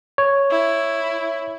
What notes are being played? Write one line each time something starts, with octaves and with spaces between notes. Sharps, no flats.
C#5
E4